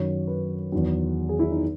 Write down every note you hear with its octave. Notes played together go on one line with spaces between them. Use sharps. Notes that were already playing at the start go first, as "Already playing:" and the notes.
Already playing: F#2 D#3 F#3 C#5
B4
E2 D#3 F#3
G#4
E4
D#4